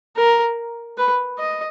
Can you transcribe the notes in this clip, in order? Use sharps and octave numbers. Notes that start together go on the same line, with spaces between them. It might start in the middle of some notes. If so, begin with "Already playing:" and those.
A#4
B4
D#5